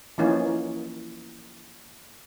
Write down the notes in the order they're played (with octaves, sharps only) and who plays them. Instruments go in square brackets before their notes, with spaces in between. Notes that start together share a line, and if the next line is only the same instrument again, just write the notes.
[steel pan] E3 F3 A#3 C#4 D#4